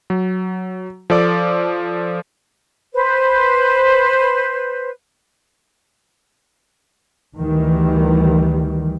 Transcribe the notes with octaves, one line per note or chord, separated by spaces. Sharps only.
F#3
F3 A4 D5 D6
B4 C5
D2 D#3 E3 G3